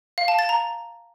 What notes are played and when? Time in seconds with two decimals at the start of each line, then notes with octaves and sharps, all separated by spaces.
0.18 F5
0.28 A5
0.39 A6
0.49 A#5